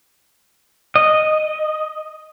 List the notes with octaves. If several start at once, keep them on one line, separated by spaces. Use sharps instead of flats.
D#5